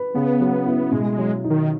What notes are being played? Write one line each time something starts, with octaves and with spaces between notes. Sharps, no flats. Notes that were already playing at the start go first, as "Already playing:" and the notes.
Already playing: B4
C#3 B3
F#3
E4
B2 G#3
G#3
F#3
D#4
D#3